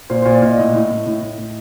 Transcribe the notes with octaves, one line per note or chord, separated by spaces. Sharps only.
A#2 C5
A#2 C5
D5
A#2 D#5
A2 D#5
A2
A2
A2
A2
A2